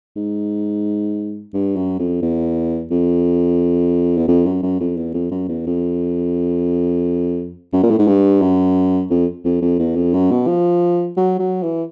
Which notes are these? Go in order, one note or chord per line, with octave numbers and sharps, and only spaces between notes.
G#2
G2
F#2
F2
E2
F2
E2
F2
F#2
F#2
F2
E2
F2
F#2
E2
F2
F#2
A#2
A2
G#2
G2
F#2
F2
F2
F2
E2
F2
F#2
B2
F3
F#3
F#3
E3